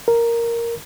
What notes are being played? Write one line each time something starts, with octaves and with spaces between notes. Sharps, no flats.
A#4